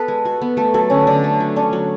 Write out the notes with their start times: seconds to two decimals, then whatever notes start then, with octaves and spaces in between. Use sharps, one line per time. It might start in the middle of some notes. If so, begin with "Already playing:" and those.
Already playing: B3 A4 B4
0.08 G#3
0.25 F#4
0.42 B3
0.57 A3 A4
0.74 F#3 A4
0.90 D3 C#4
1.07 D3 D4
1.24 A3
1.40 F#3
1.56 C#4 D4
1.73 F#3